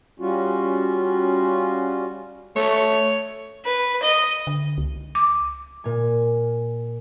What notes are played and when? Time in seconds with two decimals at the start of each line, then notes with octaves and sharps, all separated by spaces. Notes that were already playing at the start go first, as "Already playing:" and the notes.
0.20 G3 C#4 F4 F#4
2.56 A3 C#5
3.65 B4
4.02 D#5
4.47 D3
4.78 C#2
5.15 D6
5.84 A#2 G#5